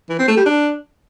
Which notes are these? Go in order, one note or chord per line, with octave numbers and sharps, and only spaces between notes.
E3
C4
A3
G3
D4